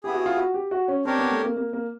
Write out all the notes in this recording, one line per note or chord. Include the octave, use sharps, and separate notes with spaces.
B3 E4 G4 G#4
F#4
F4
F#4
G4
F#4
C#4
C4 D4 G4 A#4 C#5
B3
A3
A#3
A#3
A#3